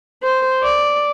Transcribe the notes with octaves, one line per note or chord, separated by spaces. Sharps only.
C5
D5